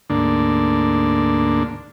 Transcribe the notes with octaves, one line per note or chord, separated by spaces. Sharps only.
D2 G#2 D3 A#3 D4